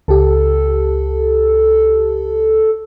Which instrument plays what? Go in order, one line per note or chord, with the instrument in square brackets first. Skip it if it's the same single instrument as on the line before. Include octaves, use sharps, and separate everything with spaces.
[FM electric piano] C#2 G4 [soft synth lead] A4